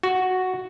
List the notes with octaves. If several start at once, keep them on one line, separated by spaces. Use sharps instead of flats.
F#4